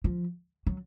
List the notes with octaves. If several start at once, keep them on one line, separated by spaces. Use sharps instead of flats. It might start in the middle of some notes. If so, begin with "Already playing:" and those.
F3
F#3